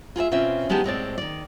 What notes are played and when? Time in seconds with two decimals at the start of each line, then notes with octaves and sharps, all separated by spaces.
0.16 F4 G#4 A#4 E5
0.31 B2 C4 C#4 F4 E5
0.69 D3 G#3 B3 D#4 G4 A5
0.84 A2 G#3 C4 D5
1.18 D#3 D5